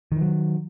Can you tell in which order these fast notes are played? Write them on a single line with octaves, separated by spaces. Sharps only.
D#3 E3 F#3